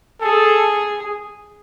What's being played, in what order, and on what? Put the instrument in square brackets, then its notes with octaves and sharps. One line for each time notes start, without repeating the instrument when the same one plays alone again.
[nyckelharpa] G#4 [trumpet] A4